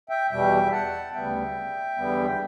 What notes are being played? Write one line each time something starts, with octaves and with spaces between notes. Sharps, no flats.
E5 G5
E2 B2 G3 E5 G5
F#5 A5
D2 C#3 G3 B3 E5 G5
E2 D3 G3 B3
G5